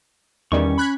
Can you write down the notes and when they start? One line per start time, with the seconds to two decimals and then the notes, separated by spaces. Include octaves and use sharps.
0.52 E2 D#3 G3 C#4 C#6
0.78 B5 F#6 G#6